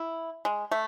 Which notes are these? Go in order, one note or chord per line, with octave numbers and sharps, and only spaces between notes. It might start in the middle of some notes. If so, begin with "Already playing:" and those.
Already playing: E4
G#3
A3